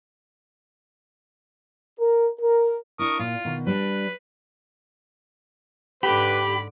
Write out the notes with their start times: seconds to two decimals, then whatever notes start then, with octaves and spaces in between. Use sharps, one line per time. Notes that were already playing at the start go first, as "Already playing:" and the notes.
1.98 A#4
2.40 A#4
2.99 D4 E4 A#4 C#6 D#6
3.19 A#2 F4
3.45 B2 D#3
3.67 G3 D4 B4
6.03 G#2 D3 G4 B4 B5 D6